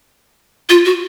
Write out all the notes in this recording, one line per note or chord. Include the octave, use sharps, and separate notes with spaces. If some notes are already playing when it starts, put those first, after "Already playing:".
F4
F#4